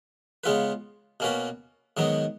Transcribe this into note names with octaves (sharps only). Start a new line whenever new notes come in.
C#3 G#3 B3 F4 B4
B2 A#3 C#4 F#4 B4
G#2 D#3 F#3 B3 D#4